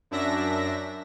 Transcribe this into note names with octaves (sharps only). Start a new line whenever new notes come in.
F#2 D4 E5 A#6